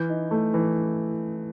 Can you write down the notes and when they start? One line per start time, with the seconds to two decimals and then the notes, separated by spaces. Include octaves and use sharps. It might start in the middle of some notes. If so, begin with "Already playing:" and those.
Already playing: E3 G6
0.10 D#4
0.31 A3
0.54 E3